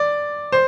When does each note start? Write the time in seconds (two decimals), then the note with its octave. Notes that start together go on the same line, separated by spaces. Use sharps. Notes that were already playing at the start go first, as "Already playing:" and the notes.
Already playing: D5
0.52 C5